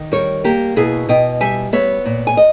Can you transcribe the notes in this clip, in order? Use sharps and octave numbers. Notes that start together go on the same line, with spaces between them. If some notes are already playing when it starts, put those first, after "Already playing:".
Already playing: D#3
G3 A#4 C#5
A#3 G4 A#4
B2 E4 G#4
B2 D#5 G5
G3 E5 G#5
B3 C#5 E5
A#2
G#5
D#5